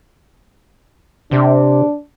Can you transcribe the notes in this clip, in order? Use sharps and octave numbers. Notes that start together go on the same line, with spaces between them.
C3 D4